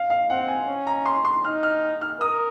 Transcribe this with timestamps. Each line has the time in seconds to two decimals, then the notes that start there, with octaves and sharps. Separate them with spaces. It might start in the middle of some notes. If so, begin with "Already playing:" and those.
Already playing: F5
0.10 F5
0.30 C4 F#5
0.48 G#5
0.67 C#4
0.87 A#5
1.06 C6
1.25 C6
1.44 D#4 F6
1.63 F6
2.01 F6
2.20 A#4 D#6